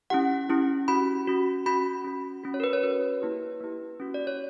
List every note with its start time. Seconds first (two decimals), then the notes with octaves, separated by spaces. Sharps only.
0.10 C#4 E4 G4 F#5
0.50 C#4 E4 G4
0.88 C#4 F#4 B5
1.27 C#4 F#4
1.66 C#4 F#4 B5
2.04 C#4 F#4
2.44 C#4 F#4
2.54 C#5
2.60 A#4
2.64 B4
2.73 C#5
2.83 C#4 F#4 B4
3.22 A#3 E4 G4
3.61 A#3 E4 G4
4.00 C#4 F#4
4.14 D5
4.27 C#5